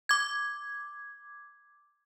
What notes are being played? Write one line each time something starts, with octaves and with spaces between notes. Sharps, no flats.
D6 G#6